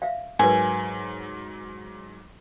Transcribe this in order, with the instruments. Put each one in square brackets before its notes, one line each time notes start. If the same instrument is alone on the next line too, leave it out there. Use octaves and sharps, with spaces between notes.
[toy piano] E5 F5
[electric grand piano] G#2 F#3 [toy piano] A#4 B4 [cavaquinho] G#5